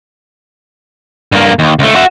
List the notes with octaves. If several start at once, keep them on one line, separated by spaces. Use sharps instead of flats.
G2 A#3
D#2
C#2 A3
F#4 E5